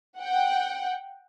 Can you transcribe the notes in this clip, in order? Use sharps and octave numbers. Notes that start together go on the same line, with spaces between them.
F#5 G5